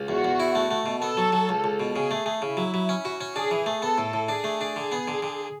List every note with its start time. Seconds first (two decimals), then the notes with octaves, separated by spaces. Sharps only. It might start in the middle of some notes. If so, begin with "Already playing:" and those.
Already playing: C#2
0.08 E2 F#4
0.25 E2
0.40 E4
0.55 A3
0.71 A3
0.86 B2
1.02 B3 A4
1.17 F#3
1.33 F#3
1.49 C#2
1.64 C#2
1.80 B2
1.95 C#3 G#4
2.11 A3
2.26 A3
2.42 C#3 E4
2.57 F#3
2.74 F#3
2.89 C#4
3.05 F#4
3.21 C#4
3.35 D4 G#4
3.51 E3
3.66 A3
3.82 B3 A4
3.98 A2
4.13 A2
4.28 D4 G#4
4.44 A3
4.61 D4
4.76 D3 G#4
4.92 B3
5.08 D3
5.22 D3